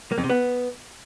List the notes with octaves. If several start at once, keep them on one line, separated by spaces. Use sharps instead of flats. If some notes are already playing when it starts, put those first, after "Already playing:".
A#3
F2
C3
B3